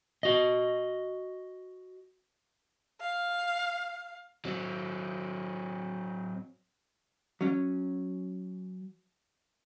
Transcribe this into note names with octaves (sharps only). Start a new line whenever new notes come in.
F#4 D#5
F5
F#3 C4
F#3 C#4